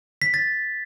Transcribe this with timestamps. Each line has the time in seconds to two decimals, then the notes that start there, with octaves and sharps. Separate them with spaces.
0.22 B6
0.34 A6